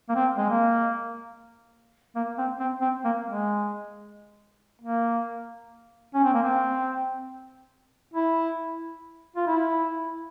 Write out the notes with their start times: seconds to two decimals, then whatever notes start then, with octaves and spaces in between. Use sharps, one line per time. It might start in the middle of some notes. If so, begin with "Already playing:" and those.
0.09 A#3
0.15 C4
0.37 G#3
0.49 A#3
2.15 A#3
2.38 C4
2.59 C4
2.81 C4
3.04 A#3
3.26 G#3
4.82 A#3
6.14 C#4
6.24 C4
6.33 A#3
6.42 C4
8.14 E4
9.36 F4
9.47 E4